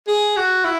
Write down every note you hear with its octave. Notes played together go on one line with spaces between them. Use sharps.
G#4
F#4
E4